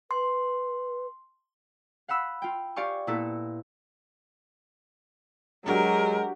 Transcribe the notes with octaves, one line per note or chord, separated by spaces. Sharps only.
B4 C6
F5 F#5 B5 E6
F4 G5
G4 D5 F5 G#5 C#6
A#2 B3 E4 A4
F#3 G#3 D4 F#4 G4 A#4